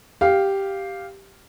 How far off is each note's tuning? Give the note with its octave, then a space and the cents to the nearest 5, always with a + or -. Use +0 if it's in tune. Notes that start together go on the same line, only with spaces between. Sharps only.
G4 +0 F5 +0